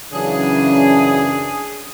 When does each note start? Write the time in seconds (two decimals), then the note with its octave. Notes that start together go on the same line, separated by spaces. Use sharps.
0.13 F#2 C#3 E3 D4 G#4